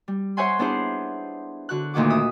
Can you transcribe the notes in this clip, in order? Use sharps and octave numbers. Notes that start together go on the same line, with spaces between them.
G3
C5 C#5 E5 F#5 G#5 C6
B3 D4 E4 G#4 C5
D3 F#4 F#6
D2 A#2 D#3 F#5 D6
E5 D#6